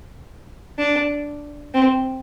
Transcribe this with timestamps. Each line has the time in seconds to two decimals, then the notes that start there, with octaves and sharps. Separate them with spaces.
0.79 D4
1.74 C4